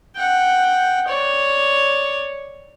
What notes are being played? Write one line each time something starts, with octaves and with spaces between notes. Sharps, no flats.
F#5 G5
C#5 D5